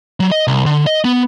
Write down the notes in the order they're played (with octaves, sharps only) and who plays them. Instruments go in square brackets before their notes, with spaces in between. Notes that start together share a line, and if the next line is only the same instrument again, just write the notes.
[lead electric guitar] F#3
D#5
C2
D3
D#5
B3